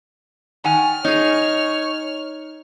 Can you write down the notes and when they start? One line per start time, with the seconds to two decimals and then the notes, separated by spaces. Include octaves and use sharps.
0.64 D#3 F#5 G#5 F6
1.05 C#4 D#4 G#4 C#5